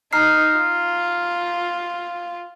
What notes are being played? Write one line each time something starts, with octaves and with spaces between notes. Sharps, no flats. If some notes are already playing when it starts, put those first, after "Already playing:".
D#4 A#5 F6 C7
F4